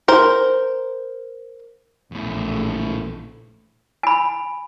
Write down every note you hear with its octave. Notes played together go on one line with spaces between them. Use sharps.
A#4 C5
A#1 E2 A2 A3
G#5 B5